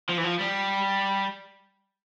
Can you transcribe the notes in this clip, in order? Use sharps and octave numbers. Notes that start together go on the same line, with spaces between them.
F3
E3
F3
G3